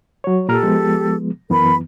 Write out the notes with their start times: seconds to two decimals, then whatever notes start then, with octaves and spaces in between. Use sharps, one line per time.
0.24 F#3 C#5
0.49 A#2 G4 A4 A#5 F6
0.63 F3 G#3 B3
1.50 F#2 E3 B3 A#4 B5